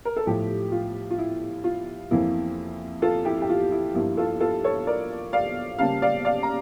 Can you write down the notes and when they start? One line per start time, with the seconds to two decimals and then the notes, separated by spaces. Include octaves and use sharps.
0.05 A#4
0.16 A4
0.26 A2 F3 A3 E4 G4
0.72 F4
1.11 F4
1.18 E4
1.64 F4
2.11 F2 E3 A#3 E4
3.02 F4 A4
3.25 E4 G4
3.42 G4
3.49 F4
3.72 E4
3.94 G2 F3 A#3 E4
4.17 F4 A4
4.40 F4 A4
4.64 A4 C#5
4.87 A#4 D5
5.33 D5 F5
5.78 C#3 G3 A#3 F5 A5
6.02 D5 F5
6.25 D5 F5
6.43 A#5